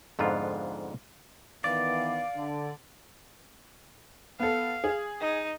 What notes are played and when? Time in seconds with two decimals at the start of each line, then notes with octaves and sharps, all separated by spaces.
0.19 F2 G#2 D3 B3 F4
1.64 D#3 E3 B3 D5 F5
2.36 D3
4.39 B3 A4 F5
4.84 G#4
5.20 D#4